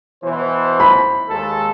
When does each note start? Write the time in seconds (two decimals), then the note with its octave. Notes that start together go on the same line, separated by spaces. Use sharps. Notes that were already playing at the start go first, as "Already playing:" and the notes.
0.23 B2 E3 C5
0.80 B5
1.29 D#2 G#3 A4